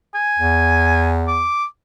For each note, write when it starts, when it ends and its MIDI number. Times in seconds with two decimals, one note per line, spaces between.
0.14 1.15 80
0.39 1.48 40
1.28 1.65 86